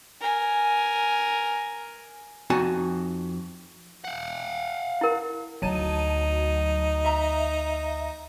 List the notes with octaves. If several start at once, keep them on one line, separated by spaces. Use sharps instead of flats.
A#4 G#5
F2 D#4 F#4 G#5 A5
F5 F#5
E4 A#4
D2 F#3 D#4 E4 A5 D#7
E5 A#5